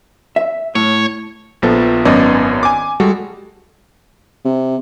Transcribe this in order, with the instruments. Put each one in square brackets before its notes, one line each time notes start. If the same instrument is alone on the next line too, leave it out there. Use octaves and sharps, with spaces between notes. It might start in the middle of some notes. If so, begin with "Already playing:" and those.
[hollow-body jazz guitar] E5
[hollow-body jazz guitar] A2 [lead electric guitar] C#5
[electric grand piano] A#1 F3 B3 A4
G#1 F#2 B3 C#4 D5 D#5
G#5 D6
G3 G#3 F#4 A4
[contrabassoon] C3